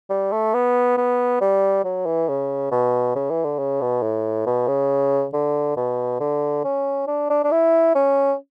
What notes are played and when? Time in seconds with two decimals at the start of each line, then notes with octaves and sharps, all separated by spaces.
0.10 G3
0.32 A3
0.54 B3
0.97 B3
1.41 G3
1.84 F#3
2.06 E3
2.29 C#3
2.71 B2
3.15 C#3
3.30 E3
3.44 D3
3.59 C#3
3.81 B2
4.02 A2
4.46 B2
4.68 C#3
5.33 D3
5.77 B2
6.20 D3
6.64 C#4
7.07 D4
7.30 D4
7.44 D4
7.51 E4
7.95 C#4